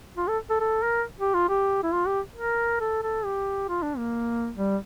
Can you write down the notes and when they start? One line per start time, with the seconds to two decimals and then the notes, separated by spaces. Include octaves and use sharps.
0.17 F4
0.28 A4
0.50 A4
0.60 A4
0.83 A#4
1.20 G4
1.34 F4
1.49 G4
1.83 E4
1.93 F4
2.07 G4
2.36 A#4
2.80 A4
3.03 A4
3.25 G4
3.68 F4
3.83 D4
3.97 A#3
4.57 G3